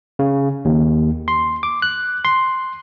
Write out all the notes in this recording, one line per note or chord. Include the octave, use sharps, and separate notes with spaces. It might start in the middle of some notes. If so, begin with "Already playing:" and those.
C#3
D#2
C6
D6
F#6
C6